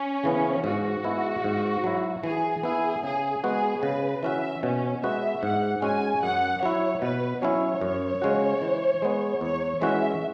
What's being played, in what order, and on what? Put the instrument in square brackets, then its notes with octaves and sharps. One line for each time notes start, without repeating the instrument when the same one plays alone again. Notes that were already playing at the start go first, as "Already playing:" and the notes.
Already playing: [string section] C#4
[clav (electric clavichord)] C#3 E3 B3
[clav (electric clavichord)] G#2 [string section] F#4
[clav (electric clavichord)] G#3 B3 E4
G#2
F#3 E4
[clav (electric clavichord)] E3 [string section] G#4
[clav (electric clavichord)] B3 E4 [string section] G#4
[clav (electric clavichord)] C#3 [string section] G#4
[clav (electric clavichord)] G#3 B3 F#4 [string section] G#4
[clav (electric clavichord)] C#3 [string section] B4
[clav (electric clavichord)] E3 C#4 F#4 [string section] E5
[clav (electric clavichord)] B2 [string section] C#4
[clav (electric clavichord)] G#3 B3 F#4 [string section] E5
[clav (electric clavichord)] G#2 [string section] F#5
[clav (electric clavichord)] G#3 C#4 F#4 [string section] G#5
[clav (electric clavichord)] F#2 [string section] F#5
[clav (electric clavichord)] F#3 E4 [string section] C#5
[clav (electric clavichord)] B2 [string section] B4
[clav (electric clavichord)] F#3 C#4 E4 [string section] C#5
[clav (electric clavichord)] F#2
C#3 G#3 C#4 F#4
E3
G#3 B3
[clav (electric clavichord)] E2 [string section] C#5
[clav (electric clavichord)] E3 G#3 C#4 F#4 [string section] E5